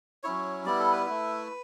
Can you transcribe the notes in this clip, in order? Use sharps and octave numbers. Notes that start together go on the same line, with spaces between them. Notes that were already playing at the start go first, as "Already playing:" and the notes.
F#3 C#4 E4 C#5
G3 B3 E4 D5
A4
B4
A3 E4